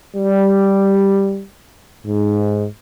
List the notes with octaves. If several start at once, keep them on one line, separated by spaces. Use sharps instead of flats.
G3
G#2